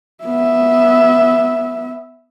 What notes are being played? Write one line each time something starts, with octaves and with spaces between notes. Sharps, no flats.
B3 E5